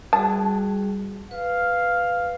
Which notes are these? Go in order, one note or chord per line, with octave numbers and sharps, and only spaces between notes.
G3 F#4 G#4 A5
B4 F5